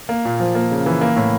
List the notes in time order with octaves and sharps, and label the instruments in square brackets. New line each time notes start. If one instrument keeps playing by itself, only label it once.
[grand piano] A#3
A#2
F3
A#3
C#3
E3
A#3
A2